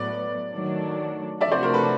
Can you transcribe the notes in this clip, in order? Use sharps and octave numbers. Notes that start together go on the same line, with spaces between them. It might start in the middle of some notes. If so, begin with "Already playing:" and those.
Already playing: A2 F#3 B3 D5
D#3 F#3 A3 D4
C3 F3 A3 D4 F#4 D5 E5
C5 D5
A#4 C5
A4 B4